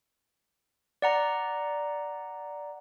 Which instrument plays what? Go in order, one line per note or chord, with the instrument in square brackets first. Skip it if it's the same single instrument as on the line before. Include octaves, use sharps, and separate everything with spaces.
[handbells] D5 F#5 A#5